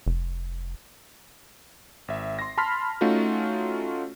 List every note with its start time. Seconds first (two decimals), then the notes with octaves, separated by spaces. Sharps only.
0.06 F1
2.08 G#1 E5
2.39 C6 A#6
2.58 A5 B5 C6 F6 B6
3.01 A3 C#4 D#4 F4 F#4